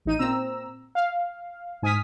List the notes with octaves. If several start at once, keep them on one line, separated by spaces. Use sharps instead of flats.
A1 D#4 D#7
A#2 C4 A#5 E6
F5
G#2 G#5 D#6 F6 B6